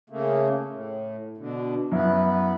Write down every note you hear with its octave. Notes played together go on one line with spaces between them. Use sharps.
C#3 A3 A#3
A2
B2 D3
F#2 B3 E4